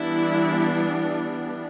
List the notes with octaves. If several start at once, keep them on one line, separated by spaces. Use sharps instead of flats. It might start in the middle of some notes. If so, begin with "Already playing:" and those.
Already playing: E3 G3 B3 D4 E4